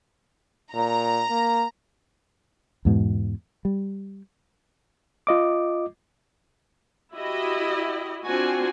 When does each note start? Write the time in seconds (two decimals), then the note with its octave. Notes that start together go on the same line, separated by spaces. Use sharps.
0.74 A#2 A#5
1.30 A#3
2.85 E2 G#2 B2
3.65 G3
5.27 F4 D#5 D6
7.13 E4 F#4 G4 D#5
8.24 C4 D4 F4 F#4 G#5